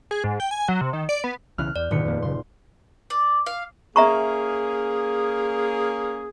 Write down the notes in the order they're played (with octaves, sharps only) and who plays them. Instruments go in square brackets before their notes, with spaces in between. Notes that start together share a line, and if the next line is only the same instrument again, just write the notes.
[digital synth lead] G#4
G#2
G5
G#5
F#3
C3
D#3
D5
B3
[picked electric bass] B1 C#3 E3 [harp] F6 F#6
[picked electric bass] E2 [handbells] D5
[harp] D#1 B4 C#7 [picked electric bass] G#2 B2 D3
[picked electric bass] F2 A#3
[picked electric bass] F#2 C#3 [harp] C6
[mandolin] D5
F5
[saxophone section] A#3 C#4 G#4 [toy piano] E5 A#5 C#6